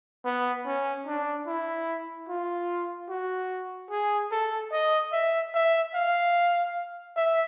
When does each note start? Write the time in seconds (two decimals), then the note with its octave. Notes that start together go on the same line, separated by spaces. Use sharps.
0.25 B3
0.66 C#4
1.07 D4
1.47 E4
2.29 F4
3.09 F#4
3.91 G#4
4.32 A4
4.72 D#5
5.12 E5
5.54 E5
5.94 F5
7.16 E5